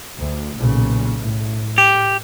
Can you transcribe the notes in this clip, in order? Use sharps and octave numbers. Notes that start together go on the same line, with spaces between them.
D2
B1 A#2 C#3
A2
G4